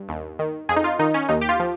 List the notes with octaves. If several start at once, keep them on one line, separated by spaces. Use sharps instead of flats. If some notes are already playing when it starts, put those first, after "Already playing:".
Already playing: G2
D#2
D#3
F2 G#4
D#4
F4
D#3 D#4
C#4
D#2 D#4
G4
F4
F3